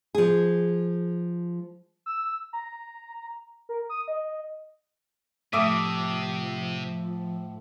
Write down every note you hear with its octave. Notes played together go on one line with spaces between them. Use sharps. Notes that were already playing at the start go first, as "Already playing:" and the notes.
F3 G#4
E6
A#5
A#4
D#6
D#5
A2 C3 F3 E5 D6 D#6